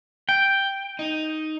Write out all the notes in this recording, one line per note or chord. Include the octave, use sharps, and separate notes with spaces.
G5
D#4